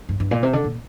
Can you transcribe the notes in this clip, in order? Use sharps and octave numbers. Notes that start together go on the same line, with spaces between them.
G2
G2
A#2
C3
D3
A#2